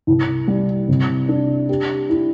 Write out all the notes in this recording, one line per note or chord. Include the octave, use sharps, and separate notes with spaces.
C2
G3
C3
D4
G4
E4